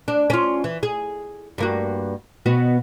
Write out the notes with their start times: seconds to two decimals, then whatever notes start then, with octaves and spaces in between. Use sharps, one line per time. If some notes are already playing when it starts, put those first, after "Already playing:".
0.08 D4
0.30 C#4 F4
0.64 E3
0.83 G#4
1.58 G2 A#3 F#4
2.46 B2 B3 F#4